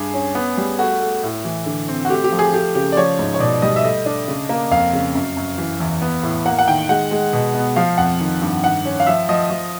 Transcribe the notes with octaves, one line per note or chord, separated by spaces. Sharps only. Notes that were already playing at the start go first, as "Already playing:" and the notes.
Already playing: G2 G#4
C#4
B3
G3
A3 F#4
A3
A2
E3
D3
C4
F#4
A3 G4
G4
F3
G#4
A3 G4
C#3 G4
D5
F3 C#5
G#2
C#5
B2 D5
G3 D#5
E5
A3 D#5
D4
C#3
A#3
F2 F5
C#3
F#2
F#2
E3
E2
B3
A2
A#3 F#5
F#5
D#3 G5
G#3 F#5
G#3
B2
B3
F3 F5
F2 F#5
D#3
G2
D#3 F#5
C#4
F5
F3 E5
F3 D#5
F3